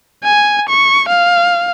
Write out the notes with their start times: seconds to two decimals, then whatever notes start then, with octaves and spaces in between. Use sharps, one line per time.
0.24 G#5
0.69 C#6
1.09 F5